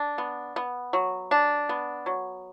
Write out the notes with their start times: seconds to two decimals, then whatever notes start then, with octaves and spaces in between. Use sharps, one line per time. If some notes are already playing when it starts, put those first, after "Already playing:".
Already playing: D4
0.18 B3
0.56 B3
0.93 F#3
1.31 D4
1.69 B3
2.06 F#3